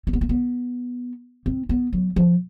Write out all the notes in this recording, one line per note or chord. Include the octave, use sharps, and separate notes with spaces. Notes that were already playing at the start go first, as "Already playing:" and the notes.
C4
B3
A#3
B3
C4
B3
F#3
F3